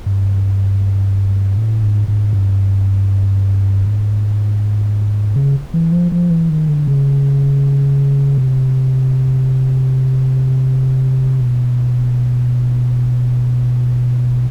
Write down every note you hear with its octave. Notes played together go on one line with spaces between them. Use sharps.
G2
A2
G#2
G#2
G2
G#2
C#3
E3
F3
F3
E3
D#3
D3
C#3
C3
B2